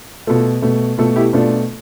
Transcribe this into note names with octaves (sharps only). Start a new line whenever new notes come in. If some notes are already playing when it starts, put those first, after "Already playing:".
B2 A3 F4 A4
B2 A3
B2 A3 F4 A4
E4 G4
B2 A3 D4 F4